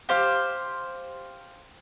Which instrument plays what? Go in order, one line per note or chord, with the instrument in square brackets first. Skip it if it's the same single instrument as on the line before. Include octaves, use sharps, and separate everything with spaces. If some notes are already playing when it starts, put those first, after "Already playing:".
[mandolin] G4 C5 F5